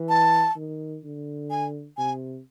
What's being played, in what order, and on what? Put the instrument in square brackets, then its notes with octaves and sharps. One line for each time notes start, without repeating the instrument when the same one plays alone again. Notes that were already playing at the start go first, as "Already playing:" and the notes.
Already playing: [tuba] E3
[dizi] A5
[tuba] D#3
D3
[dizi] G#5
[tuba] C3 [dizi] G#5